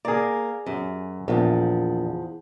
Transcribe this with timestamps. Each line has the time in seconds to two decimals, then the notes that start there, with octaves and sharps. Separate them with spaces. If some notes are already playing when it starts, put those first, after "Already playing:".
0.05 A#3 G#4 A#4 D5
0.66 F#2
1.28 A#1 E2 F3